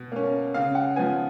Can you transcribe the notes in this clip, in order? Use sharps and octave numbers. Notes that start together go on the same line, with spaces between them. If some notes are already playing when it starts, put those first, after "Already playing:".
Already playing: B2
A#3 C#4
C#3 F5
F#5
F3 B3 G#5